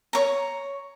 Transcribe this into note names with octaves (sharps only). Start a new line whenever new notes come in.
C#5 A#5